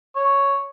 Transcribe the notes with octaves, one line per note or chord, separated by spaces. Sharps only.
C#5